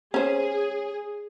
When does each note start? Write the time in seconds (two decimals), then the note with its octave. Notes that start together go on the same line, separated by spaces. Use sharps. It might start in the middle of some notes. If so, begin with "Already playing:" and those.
0.14 C#4 G#4 C5